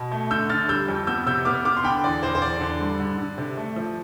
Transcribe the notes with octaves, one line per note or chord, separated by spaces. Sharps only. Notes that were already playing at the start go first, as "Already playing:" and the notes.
Already playing: B2
A3
D3 E6 G6
D3 F6 A6
G3 E6 G6
F2
B3 E6 G6
C3 E6 G6
B3 D6 F6
B3 D6 F6
C6
D3 G5 B5
E2 D5
E2 C5
C5
E2 D5
D3
G2
D3
D3
C3
A3
F3